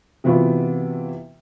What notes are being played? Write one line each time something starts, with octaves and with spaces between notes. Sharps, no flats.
C3 E3 B3 F4 F#4